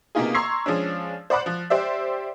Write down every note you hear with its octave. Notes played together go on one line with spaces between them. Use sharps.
C3 A#3 B3 D#4 F4 G#4
A#5 C6 C#6 E6 G#6 C7
F3 G#3 C#4 D4
C5 D5 F#5 B5 D6 F#6
F3
G4 C5 D5 E5